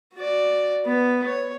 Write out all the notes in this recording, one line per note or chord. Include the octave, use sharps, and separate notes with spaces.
F#4 D5
B3
C#5